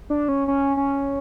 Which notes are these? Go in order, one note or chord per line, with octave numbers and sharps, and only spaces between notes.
D4
C#4
C#4
C#4